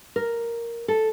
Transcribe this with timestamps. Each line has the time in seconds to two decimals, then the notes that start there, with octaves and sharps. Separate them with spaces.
0.16 A#4
0.88 A4